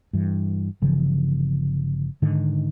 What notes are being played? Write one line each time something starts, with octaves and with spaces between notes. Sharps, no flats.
G2 E3
G1 C#3 E3 F3
G#2 D3 D#3